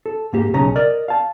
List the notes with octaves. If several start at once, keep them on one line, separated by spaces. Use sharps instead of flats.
A4
G#2 A#3 G4
B1 C#3 C#4 A#5
A#4 D5 D#5
F5 A5